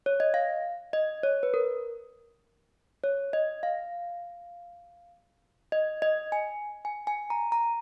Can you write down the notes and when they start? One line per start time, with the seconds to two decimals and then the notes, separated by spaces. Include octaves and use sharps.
0.06 C#5
0.20 D#5
0.34 F5
0.93 D#5
1.23 C#5
1.43 B4
1.54 A#4
3.04 C#5
3.33 D#5
3.63 F5
5.72 D#5
6.02 D#5
6.32 G#5
6.85 G#5
7.07 G#5
7.30 A#5
7.52 A#5